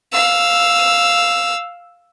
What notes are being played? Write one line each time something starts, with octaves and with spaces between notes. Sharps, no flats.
F5 E6